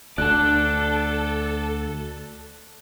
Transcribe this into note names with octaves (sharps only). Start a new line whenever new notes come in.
D2 A4 D5 A5 F#6